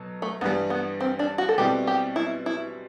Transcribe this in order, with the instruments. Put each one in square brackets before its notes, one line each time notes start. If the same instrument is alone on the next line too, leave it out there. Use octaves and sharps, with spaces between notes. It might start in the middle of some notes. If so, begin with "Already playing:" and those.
Already playing: [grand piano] B2 F#3 A4
[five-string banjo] A3
[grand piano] G2 E3 G3 [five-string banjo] B3
[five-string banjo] B3
C4
D4
F#4
A4
[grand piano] B2 G3 C4 E4 [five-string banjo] G4
[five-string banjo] G4
E4
E4